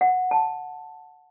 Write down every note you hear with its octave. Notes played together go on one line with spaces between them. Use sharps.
F#5
A5